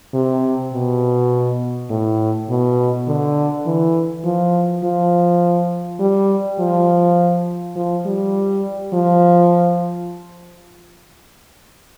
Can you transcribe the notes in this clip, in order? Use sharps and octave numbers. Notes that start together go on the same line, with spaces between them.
C3
B2
A2
B2
D3
E3
F3
F3
G3
F3
F3
G3
F3